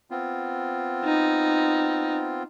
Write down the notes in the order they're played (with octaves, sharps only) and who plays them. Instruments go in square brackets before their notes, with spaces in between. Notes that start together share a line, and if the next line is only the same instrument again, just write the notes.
[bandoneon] B3 C4 F4
[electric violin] D#4